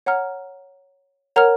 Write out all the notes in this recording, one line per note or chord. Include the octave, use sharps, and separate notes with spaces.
C#5 F#5 A#5 F6
A#4 C#5 F#5 A#5 F6